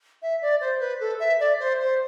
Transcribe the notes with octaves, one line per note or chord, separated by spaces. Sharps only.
E5
D5
C5
B4
A4
E5
D5
C5
C5